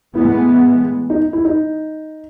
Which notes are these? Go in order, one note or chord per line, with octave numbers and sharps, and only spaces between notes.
A2 E3 G#3 B3 E4
D#4
E4
D#4